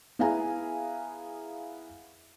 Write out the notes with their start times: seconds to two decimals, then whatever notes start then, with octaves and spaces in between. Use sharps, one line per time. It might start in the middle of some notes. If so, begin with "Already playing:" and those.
0.19 B3 E4 G#4 F5 G#5 A#5